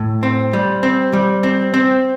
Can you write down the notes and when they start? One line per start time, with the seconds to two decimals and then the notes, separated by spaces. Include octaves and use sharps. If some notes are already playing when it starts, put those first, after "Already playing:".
Already playing: A2
0.23 C4
0.53 G3
0.83 C4
1.13 G3
1.43 C4
1.74 C4